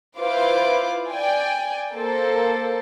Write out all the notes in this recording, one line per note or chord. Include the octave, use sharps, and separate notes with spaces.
E4 F4 B4 C5 F5 D6
D5 G5 G#5
A#3 A4 C5